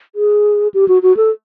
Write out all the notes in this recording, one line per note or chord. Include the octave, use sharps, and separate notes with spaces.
G#4
G4
F#4
F#4
A4